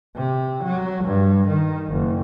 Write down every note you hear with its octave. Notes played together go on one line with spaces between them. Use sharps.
C3
F#3
G2
D#3
F#1